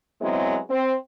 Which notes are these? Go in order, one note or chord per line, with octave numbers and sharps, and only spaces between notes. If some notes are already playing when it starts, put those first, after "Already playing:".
F#3 G#3 B3 C4 E4 G#4
C4